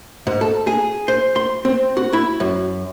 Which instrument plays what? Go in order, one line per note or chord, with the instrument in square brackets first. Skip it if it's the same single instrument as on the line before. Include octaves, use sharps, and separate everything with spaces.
[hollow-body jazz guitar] G#2
A4
G#4
C5
C6
C4
F#4
E4
F#2